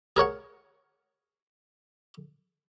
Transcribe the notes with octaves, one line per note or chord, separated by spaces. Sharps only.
G#4 A#4 C#5 F#5